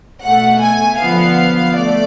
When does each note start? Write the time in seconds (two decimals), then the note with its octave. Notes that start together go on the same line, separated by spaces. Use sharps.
0.22 B2 A3 F#5
0.61 G#5
0.99 D3 F3 B3 F5
1.76 A3 D5